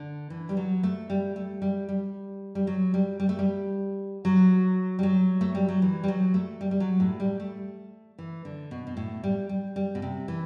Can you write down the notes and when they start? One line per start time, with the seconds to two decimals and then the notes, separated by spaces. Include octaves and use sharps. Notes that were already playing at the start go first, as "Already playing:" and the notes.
Already playing: D3
0.30 E3
0.49 G3
0.57 F#3
0.83 A3
1.10 G3
1.36 A3
1.62 G3
1.89 G3
2.55 G3
2.67 F#3
2.94 G3
3.20 G3
3.29 A3
3.39 G3
4.25 F#3
4.99 G3
5.03 F#3
5.41 A3
5.55 G3
5.68 F#3
5.82 E3
6.04 G3
6.08 F#3
6.34 A3
6.61 G3
6.71 G3
6.80 F#3
7.00 A2
7.20 G3
7.40 A3
8.19 E3
8.45 D3
8.71 B2
8.87 B2
8.97 A2
9.24 G3
9.49 G3
9.76 G3
9.95 B2
10.02 C3
10.28 E3